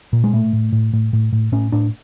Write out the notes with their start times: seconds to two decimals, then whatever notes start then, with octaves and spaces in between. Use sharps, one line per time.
0.13 A#2
0.24 G#3
0.33 A2 A3
0.53 A2
0.72 A2
0.93 A2
1.13 A2
1.33 A2
1.52 A2 C#4
1.72 A2 D4